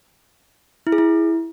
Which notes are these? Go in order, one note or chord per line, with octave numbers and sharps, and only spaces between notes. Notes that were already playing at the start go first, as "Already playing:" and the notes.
E4
G#4
E4